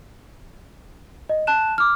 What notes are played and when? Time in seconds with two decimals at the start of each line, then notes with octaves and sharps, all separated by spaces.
1.30 D#5
1.47 A5 F#6 E7
1.78 D6 F6